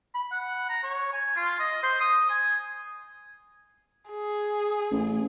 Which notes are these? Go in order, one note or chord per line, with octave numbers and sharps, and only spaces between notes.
B5
F#5
A#5
C#5
G#5
F4
D#5
C5
D#6
G#5
G#4
A1